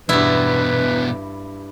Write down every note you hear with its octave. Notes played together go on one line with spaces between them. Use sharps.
E2 G2 B2 E4 B4